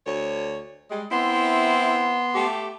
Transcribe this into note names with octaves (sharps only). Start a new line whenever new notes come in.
D2 C#5
G3 G#3
B3 C4 E4 C6
A3 G4